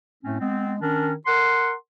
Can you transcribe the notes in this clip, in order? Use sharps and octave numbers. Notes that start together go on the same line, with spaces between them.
A2 A3 C4 C#4
G#3 B3 C4
D#3 C#4 D4 A#4
A#4 F#5 C6